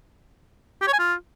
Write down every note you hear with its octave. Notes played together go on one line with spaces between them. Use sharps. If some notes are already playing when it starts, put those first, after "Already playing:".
G4
C#5
G#5
F4